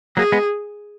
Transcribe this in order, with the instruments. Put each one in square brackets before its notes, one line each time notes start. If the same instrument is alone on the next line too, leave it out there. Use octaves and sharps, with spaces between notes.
[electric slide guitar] F#3 A#3 [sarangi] G#4
[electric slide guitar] G#3 B3